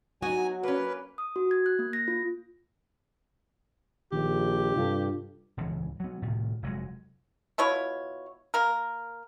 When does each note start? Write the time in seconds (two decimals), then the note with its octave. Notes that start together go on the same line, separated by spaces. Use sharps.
0.22 F#3 B3 D#4 F#4 G#5
0.63 A#3 C#4 B4
1.18 D#6
1.36 F#4
1.51 G#6
1.66 F#6
1.79 A#3
1.93 A#6
2.08 F4
4.12 A#1 D#3 G4
4.76 G2 C3 F4 A4
5.57 D#1 C#2 G#2 E3
6.00 F#3 B3
6.22 A2 C3 D#3 A3
6.62 F1 F#3 G#3
7.58 B2 E4 F4 C#5
8.54 A#3 A#4